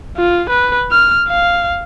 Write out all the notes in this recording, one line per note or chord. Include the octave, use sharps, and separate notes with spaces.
F4
B4
F6
F5